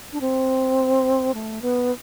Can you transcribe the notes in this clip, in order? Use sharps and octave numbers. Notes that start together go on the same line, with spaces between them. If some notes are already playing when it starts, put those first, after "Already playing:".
D4
C4
A3
B3